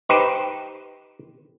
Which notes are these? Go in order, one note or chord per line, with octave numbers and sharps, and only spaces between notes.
D#4 G4 B4 C5